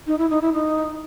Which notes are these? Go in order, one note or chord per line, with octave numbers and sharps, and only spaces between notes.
D#4
E4
D#4
E4
D#4